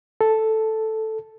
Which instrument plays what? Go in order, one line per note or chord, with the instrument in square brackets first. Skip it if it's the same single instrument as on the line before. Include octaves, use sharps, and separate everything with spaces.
[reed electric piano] A4